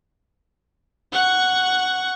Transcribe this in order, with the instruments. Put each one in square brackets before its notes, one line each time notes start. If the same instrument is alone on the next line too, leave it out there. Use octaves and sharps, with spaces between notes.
[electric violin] F#5 C#6